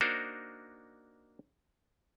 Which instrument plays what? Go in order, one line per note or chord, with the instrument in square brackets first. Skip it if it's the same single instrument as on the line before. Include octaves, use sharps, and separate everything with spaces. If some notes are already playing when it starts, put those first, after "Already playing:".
[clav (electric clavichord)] A#3 D4 D#4 F#4 A#4 C5